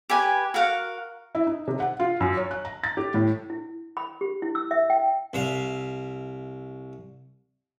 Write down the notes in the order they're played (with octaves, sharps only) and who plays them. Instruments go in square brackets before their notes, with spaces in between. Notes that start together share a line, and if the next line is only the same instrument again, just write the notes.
[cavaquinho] G4 B4 G#5
F#4 A#4 F5 F#5
[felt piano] E4
D#4
C3
F#5
F4
F#2
C#5
F#6
A#5
A6
G4
A2
[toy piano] E4
B5
G4
E4
E6
E5
G5
[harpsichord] C2 E5 F5